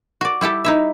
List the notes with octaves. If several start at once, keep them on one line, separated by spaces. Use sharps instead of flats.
F#4 D5
G3 E4 G4 A4
D#4 E4 E5